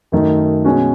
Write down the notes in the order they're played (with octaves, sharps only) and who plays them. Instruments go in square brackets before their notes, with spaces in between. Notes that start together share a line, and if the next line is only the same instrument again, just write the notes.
[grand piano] F#2 D#3 F#3 A3 D#4
B2 G#3 C#4 F#4